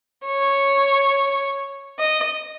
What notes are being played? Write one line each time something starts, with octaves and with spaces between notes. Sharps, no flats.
C#5
D#5